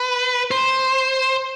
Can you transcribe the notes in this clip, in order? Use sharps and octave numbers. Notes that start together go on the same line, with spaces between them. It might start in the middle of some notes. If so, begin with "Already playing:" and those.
Already playing: B4
C5